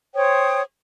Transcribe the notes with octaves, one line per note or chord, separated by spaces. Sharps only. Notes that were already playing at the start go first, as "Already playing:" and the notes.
C5 C#5 G5 D#6